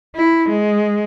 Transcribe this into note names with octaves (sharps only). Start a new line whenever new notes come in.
E4
G#3